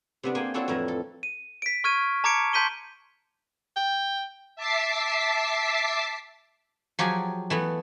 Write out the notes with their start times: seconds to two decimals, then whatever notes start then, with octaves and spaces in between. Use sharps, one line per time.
0.23 C3 B3 D4
0.35 A#3 G#4 C5 G5 G#5
0.54 C4 D4 E4 F#4 A4 C#5
0.68 F2 A2 E3 E4 A#5
0.88 A4
1.23 D#7
1.62 B6 D7
1.84 C#6 F6 G#6 D#7
2.24 A5 A#5 D6 G#6 C#7 D7
2.53 A5 C6 G6 B6 D#7 G7
3.76 G5
4.56 E5 A5 D6 B6 C7
6.99 F3 F#3 G4 G#4 F5 G#5
7.50 E3 A3 B3